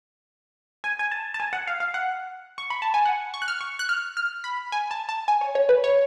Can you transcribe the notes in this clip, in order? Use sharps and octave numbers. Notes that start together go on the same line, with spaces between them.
G#5
G#5
A5
A5
G#5
F#5
F5
F5
F#5
C#6
B5
A5
G#5
F#5
C#6
F#6
F6
C#6
F#6
F6
F6
B5
G#5
A5
A5
G#5
C#5
C#5
B4
C#5